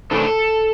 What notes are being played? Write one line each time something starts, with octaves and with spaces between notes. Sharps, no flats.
C3 E3 A3 D4 A4